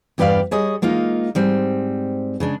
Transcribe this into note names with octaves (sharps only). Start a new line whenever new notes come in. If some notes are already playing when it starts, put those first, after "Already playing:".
E2 G2 G4 B4 D5 F5
G3 G#4 C#5 D#5
G#3 A#3 D#4 F4
G#2 G3 C4
C#3 G#3 D4